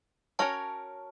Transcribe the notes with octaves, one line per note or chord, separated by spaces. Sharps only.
C#4 F#4 A#4 C#5 A5